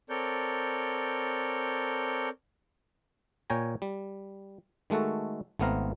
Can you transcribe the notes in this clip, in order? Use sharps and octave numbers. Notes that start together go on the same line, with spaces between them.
C4 A4 A#4 C#5 D5 G6
A#2 C#5 G5 G#5 A#5
G3
D#3 G#3 A3 F#4 A4
G#1 A3 B3 C4 F5 A#5